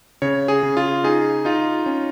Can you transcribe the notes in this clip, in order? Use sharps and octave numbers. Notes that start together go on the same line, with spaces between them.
C#3 C#5
G#4
C#3
F4
D#4 G#4
D#4 F4
C#4